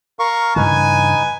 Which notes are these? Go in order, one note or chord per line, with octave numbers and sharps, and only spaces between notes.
A#4 F5 C#6
G2 C#3 E3 D#4 B4 G#5